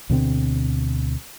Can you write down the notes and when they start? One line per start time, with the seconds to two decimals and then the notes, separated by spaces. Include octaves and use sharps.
0.10 D2 B2 D3 C4